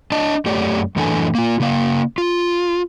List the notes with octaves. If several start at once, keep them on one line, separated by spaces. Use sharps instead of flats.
D4 D#5 A5
F#2 A3 G4 C#5 D5
F#2 A2 E3 D4 A4 G#5
A#3 F4
C#3 A#3 F5
F4